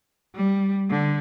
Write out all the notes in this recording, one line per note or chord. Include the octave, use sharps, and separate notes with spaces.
G3
D3